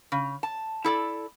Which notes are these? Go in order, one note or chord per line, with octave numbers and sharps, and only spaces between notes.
C#3
A5
E4 A4 D5